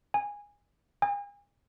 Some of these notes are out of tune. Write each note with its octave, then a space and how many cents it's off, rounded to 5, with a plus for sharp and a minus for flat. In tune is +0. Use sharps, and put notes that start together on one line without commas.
G#5 -15
G#5 -40